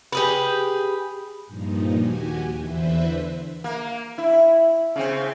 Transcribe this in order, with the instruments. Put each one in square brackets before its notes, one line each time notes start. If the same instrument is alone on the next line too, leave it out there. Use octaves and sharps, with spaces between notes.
[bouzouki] G4 G#4 B4
[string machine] G2 A#2 F3 D#4
D#2 F#4 G4 G#5
E2 D3 E3 B4 C5 E5
[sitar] A#3
E4
C#3 C4